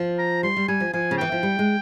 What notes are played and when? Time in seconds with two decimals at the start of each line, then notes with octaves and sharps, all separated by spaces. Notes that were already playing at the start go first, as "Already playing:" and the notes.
Already playing: F3
0.18 A#5
0.43 G3 C6
0.56 G3
0.68 G3 G#5
0.80 F3
0.93 F3 G#5
1.11 C#3
1.18 E3 G5
1.32 F3
1.43 G3
1.59 G#3